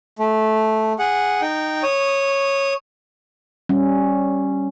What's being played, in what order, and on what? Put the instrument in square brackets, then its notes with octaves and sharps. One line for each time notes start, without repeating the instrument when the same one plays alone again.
[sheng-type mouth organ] A3
G#4 F#5
D#4 G5
C#5 D#6
[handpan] G3 C#4